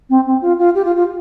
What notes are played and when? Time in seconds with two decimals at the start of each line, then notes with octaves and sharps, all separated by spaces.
0.10 C4
0.26 C4
0.42 F4
0.59 F4
0.75 G4
0.85 F4
0.96 F4